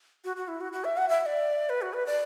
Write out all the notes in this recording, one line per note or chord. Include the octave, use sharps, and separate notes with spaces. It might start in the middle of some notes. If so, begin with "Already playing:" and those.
F#4
F#4
E4
F#4
F#4
E5
F#5
E5
E5
D5
B4
F#4
B4
D5